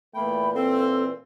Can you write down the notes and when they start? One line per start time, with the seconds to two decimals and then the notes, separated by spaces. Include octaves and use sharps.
0.15 A#2 E3 A3 A#3 G5 B5
0.54 A#3 C4 A4